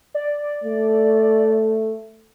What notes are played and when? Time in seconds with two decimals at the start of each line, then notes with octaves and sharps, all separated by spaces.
0.14 D5
0.64 A3